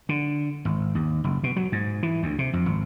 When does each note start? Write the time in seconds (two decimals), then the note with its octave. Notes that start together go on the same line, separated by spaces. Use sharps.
0.09 D3
0.65 G#1
0.95 D#2
1.24 F#1
1.43 B2
1.56 F#3
1.72 G#2
2.03 E3
2.23 D2
2.39 C3
2.53 F2
2.66 G#1